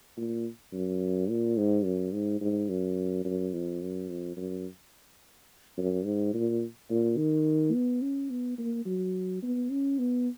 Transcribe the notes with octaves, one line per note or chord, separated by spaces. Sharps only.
A#2
F#2
A#2
G#2
F#2
G#2
G#2
F#2
F#2
F2
F#2
F2
F#2
F#2
G#2
A#2
A#2
D#3
B3
C#4
B3
A#3
F#3
B3
C#4
B3